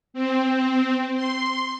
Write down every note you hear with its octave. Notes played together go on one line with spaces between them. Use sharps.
C4
C6